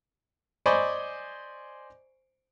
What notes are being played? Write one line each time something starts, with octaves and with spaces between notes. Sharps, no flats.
C5 D5 D#5 G#5 B5 C#6